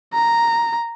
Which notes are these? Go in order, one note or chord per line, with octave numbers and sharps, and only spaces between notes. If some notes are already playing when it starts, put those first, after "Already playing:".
A#5